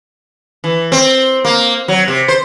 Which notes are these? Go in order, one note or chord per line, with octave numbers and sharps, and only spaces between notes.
E3
C4
A#3
F#3
C3
C5